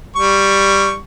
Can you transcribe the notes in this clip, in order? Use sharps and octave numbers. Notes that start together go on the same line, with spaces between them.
G3 C#6